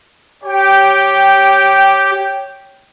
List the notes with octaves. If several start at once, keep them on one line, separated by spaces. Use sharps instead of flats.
G4 C#5 G5